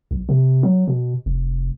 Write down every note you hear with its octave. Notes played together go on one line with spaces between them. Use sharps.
B1
C3
F#3
B2
F1